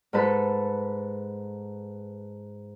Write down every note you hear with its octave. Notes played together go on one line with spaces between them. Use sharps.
G#2 A4 B4